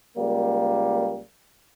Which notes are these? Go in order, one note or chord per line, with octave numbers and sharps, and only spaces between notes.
C#2 G3 A#3